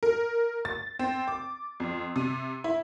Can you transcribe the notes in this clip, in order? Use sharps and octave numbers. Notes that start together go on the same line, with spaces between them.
A#4
A6
C4
D6
F2
C3
E4